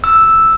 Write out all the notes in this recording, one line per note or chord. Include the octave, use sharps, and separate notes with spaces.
E6